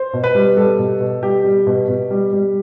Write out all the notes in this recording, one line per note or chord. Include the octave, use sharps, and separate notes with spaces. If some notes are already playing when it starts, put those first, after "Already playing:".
Already playing: C5
B2
B4
G3
G3 A4
B2
B2
G3 G4
G3
B2
B2
G3
G3